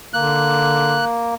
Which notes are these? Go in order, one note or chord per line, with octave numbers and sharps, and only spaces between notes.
D3 A#3 F#6